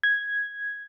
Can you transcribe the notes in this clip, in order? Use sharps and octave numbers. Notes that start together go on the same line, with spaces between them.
G#6